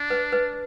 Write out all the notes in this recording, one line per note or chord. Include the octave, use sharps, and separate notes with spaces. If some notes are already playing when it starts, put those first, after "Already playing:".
Already playing: D4
B4
B4